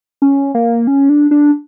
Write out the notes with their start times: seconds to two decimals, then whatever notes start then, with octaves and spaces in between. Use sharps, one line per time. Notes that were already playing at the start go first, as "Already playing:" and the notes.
0.22 C#4
0.55 A#3
0.87 C#4
1.09 D4
1.31 D4